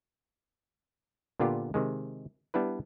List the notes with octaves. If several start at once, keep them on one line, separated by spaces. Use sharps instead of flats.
A#2 D3 B3 F4 G4
C3 D#3 G#3
G3 B3 D4 E4 B4